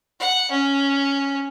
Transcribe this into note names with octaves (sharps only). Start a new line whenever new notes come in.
F#5
C#4